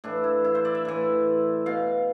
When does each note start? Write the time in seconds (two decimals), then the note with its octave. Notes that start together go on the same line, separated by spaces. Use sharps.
0.04 A2 E3 D4
0.24 E4
0.44 E4
0.55 C5
0.65 D5
0.75 E5
0.85 A2 E3
1.66 B2 F5